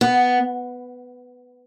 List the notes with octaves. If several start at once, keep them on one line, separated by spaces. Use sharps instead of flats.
B3